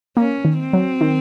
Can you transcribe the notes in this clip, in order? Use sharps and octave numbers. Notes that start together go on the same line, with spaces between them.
A#3 C#4
D#3
C4
F#3
D#3